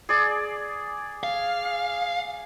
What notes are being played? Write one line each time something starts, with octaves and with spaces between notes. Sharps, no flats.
G#4 D5
F5